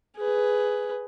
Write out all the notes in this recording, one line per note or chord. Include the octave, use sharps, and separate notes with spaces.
G#4 B4